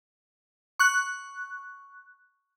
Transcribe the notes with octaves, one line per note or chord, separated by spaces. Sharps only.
C#6 F#6